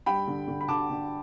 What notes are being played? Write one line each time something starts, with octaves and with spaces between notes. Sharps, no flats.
G2 G5 B5
D3
D3
B5
D3 A5 D6
D3